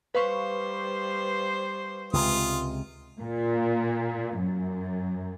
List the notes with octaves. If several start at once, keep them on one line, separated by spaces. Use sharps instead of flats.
G3 B4 C5 F5 C#6
C#2 C3 G#3 F4 D#6
A#2
F#2